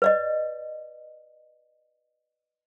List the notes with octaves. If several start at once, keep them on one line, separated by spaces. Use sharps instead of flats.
B4 D5 D#5